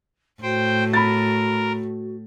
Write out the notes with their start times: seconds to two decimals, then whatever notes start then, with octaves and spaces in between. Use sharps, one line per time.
0.42 A2 F#4 C5 G5
0.93 A#4 B5 A6